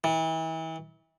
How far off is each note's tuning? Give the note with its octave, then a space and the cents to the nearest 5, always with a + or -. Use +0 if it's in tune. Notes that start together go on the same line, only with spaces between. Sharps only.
E3 -35